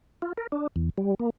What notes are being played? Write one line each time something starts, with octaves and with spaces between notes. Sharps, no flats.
F4
A#4
D4
E2
G3
A#3